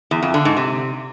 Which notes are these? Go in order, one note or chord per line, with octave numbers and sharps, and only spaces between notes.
E2
F2
D3
G#2
C3